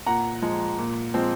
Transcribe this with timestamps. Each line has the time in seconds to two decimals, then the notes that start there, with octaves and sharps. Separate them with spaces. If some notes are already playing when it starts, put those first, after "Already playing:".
0.06 A#2 F#5 A#5
0.42 F3 G#3
0.78 A#2
1.14 F3 G#3 C4